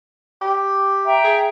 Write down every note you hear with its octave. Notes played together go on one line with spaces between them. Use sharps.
G4
E5 G5 A#5
G#4